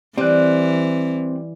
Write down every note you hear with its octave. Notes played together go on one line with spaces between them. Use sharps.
E3 G3 C4 F#6